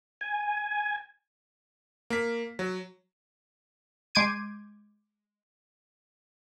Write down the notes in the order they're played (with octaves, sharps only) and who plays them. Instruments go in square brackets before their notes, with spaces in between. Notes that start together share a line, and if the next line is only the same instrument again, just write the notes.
[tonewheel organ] G#5
[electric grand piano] A#3 B6
F#3
[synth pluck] G#3 C6 D6 G6 G#6 D#7